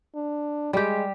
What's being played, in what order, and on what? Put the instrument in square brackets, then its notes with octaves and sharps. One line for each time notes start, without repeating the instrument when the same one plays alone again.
[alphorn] D4
[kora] G3 G4 [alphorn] G#3